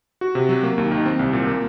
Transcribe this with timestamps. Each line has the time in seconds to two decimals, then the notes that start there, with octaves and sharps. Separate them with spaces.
0.21 F#4
0.35 C3
0.49 F#3
0.63 A#3
0.78 D#2
0.91 D#3
1.06 C4
1.19 C2
1.33 A#2
1.47 A#3